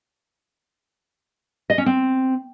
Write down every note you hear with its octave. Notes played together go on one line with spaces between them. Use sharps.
D#5
C#4
C4